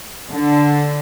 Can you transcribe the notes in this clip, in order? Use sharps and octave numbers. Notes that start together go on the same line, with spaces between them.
D3